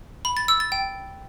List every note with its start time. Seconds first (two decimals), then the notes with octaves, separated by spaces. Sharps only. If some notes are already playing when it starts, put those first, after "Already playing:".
0.25 B5
0.37 A6
0.48 E6
0.60 A6
0.72 G5